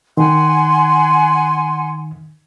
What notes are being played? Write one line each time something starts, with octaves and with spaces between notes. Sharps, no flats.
D#3 F#5 G#5 C6